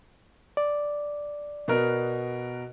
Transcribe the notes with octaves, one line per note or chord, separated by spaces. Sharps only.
D5
B2 B3 A#4